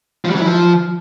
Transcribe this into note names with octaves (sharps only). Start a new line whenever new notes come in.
F3
G3
F#3
E4
F3